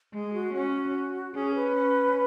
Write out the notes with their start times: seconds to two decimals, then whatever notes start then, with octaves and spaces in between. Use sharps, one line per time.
0.13 G#3 G#4
0.33 F#4
0.54 C#4 F#4
1.34 C#4 G#4
1.55 B4
1.76 C#4